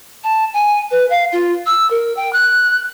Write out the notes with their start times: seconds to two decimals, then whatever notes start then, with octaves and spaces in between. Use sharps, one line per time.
0.23 A5
0.53 G#5
0.91 B4
1.10 F5
1.32 F4
1.66 E6
1.90 A#4
2.16 G5
2.32 F#6